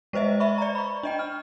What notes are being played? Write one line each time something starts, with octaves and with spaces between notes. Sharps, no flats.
G#3 B4 C5 D#5 E5
E5 B5 C#6
D5 A#5
B5 C#6
D4 D#5 G5
F6